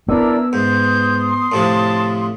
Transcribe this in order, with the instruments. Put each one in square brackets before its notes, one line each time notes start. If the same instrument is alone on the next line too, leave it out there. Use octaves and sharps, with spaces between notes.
[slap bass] B3 [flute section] D4 E4 A#4 [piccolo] E6
[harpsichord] G#2 [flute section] C6 D#6 [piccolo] G6
[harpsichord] A2 C3 F3 [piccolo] A5